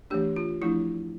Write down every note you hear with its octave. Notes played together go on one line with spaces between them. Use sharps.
E3 A3 D4 G4
F4
F3 A3 D4 E4